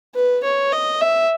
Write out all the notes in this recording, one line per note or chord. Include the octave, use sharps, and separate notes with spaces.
B4
C#5
D#5
E5